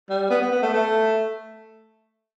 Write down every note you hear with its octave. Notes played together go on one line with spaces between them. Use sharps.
G3
B3
B3
B3
A3
A3